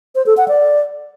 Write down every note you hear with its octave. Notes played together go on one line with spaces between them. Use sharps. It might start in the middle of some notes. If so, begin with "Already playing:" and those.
C5
A4
F#5
D5